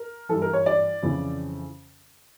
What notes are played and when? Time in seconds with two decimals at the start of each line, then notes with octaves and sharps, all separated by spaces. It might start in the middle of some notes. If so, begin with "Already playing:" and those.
Already playing: A#4
0.29 G2 E3 A4
0.42 A#4
0.53 C#5
0.66 D5
1.02 F2 C#3 E3